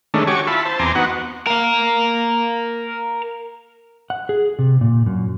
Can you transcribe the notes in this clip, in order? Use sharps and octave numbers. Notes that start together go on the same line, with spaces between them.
D#3 G#3 A3 C#4 D4
F#4 G4 C#5 G#5 C#6 D6
E4 F4 A5 B5
C5 A5
E2 C4 G#5 A#5 C6 D6
B3 D#4 F#4 F#5
A#4 F5
F#5
G#4
C3
A#2
F#2